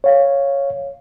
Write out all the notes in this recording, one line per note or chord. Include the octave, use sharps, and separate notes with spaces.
C#5 F5